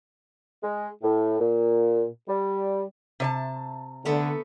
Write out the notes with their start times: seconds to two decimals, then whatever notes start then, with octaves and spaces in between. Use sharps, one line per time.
0.62 G#3
1.03 A2
1.39 A#2
2.28 G3
3.20 C3 C#5 A5
4.05 D3 A3 B3 A4